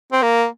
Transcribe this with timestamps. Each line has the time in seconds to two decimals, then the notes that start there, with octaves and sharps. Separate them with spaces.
0.12 C4
0.22 A#3